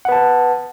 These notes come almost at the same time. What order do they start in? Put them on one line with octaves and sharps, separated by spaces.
F#5 B4 A5